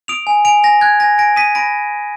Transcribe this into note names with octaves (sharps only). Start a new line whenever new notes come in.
D#6 D7 F7
G#5
G#5 D7 F7
G#5 A#6
F#6 G#6
G#5 A#6
G#5 A#6 D7
D#6 B6 D#7
B5 A#6 D7